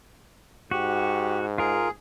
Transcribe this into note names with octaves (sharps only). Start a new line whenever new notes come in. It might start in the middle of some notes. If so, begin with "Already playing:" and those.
G#2 F#4 G4
F4 G#4 A#4